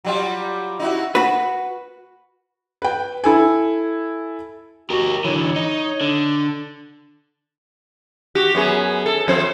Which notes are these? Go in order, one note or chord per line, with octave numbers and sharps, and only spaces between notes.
F#3 G3 F4
D#4 E4 F#4
F#4 B4
B4 G5
E4 A4 G#5
F#4 G4 A#4
D3 E3 C#5
D#4
D3
F#4 G4
F#2 B3 G#4
A4
F2 C4 C5